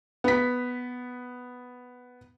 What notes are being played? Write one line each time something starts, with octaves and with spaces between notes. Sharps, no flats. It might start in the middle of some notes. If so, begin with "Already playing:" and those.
B3 B6